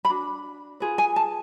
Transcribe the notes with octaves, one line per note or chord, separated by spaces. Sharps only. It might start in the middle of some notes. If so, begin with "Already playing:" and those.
B5
D4 F#4
F4 G#4 B4
G#5
A5